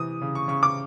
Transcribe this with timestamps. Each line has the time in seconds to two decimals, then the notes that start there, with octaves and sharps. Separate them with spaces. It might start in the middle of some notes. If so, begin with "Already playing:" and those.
Already playing: C3 E3 D#6
0.22 C#3
0.35 C#6
0.48 C#3 C#6
0.63 D6